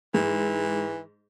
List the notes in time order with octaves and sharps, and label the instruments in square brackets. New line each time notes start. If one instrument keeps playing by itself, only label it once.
[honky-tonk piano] G#2 [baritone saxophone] E3